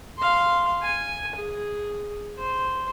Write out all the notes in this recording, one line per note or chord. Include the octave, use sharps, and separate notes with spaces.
F5 C6
G#5
G#4
C5